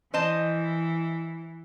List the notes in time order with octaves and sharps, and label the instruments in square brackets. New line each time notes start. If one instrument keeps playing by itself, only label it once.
[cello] E3 [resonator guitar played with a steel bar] C5 D#5 A5